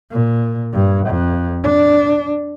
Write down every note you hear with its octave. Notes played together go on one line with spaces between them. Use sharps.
A#2
G2
F2
D4